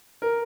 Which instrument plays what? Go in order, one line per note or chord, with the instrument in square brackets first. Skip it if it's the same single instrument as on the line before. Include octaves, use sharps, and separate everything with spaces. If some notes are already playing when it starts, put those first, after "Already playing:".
[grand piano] A#4